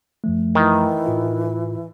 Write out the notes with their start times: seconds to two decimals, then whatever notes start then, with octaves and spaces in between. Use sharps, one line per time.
0.24 F#2 F3 A3
0.55 D#3 E3
1.06 A2 F4